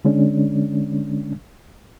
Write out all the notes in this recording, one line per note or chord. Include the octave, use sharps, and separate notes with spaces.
D3 G#3 C#4 D4